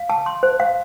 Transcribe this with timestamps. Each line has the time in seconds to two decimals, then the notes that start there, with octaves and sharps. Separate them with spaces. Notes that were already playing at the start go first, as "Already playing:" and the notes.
Already playing: F5
0.10 A5
0.26 C6
0.43 C5
0.60 F5